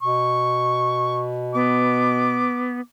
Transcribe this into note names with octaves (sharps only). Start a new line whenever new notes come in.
B2 C#6
B3 D6